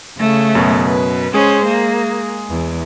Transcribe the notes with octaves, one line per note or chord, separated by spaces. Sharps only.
C#3 A3
F#2 B2
B4
G#3 C#4 G#4 C5
A#3
E2